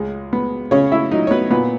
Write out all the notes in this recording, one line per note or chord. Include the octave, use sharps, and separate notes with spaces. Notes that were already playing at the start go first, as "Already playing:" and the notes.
Already playing: C#2 G#3
B3
C#3 C#4 C#5
E4 E5
F#3 D#4 D#5
C#5
B3 B4
A#2 B3 B4